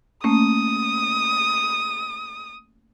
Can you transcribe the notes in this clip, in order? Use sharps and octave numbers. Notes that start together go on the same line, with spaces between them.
A3 A#3 C#4 D#6